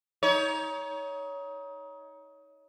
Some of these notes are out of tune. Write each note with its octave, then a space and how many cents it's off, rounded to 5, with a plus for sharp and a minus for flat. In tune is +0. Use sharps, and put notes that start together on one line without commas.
D#4 +25 C#5 +20